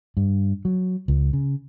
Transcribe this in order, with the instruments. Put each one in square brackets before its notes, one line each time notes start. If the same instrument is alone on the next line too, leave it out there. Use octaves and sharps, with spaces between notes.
[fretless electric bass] G2
F#3
C#2
C#3